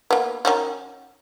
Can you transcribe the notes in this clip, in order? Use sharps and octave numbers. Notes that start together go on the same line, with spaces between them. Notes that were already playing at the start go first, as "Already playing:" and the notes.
A#3 B3
D#3 C#4 F#4